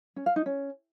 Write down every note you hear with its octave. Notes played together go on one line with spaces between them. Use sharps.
C#4
F5
D#4
C#4